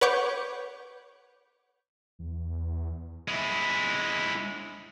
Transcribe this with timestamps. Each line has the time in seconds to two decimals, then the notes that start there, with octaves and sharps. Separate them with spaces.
0.01 B4 C#5 F#5 C#6 D6 G6
2.19 E2
3.28 G#3 E4